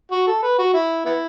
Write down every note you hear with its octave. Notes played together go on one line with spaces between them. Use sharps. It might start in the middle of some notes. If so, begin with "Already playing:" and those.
F#4
A4
B4
F#4
E4
B3 E4